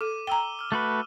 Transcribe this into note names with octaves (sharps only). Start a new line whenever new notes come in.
A4 D6 D#7
G5 A#5 E6 G7
E6 F6
A3 F#4 B4